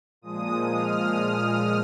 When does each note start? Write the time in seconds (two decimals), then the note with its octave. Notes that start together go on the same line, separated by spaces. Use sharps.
0.22 A#2 F3 G#3 D#6
0.72 F6